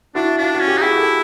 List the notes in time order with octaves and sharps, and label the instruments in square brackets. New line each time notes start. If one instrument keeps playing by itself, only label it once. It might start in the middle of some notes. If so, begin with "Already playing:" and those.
[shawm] D4 [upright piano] E4 F#4
[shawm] D4 [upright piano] F4
[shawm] C#4 [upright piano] F#4
[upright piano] G4
[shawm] D#4
[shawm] E4 [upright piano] F#4 G#4
[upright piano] G4 A4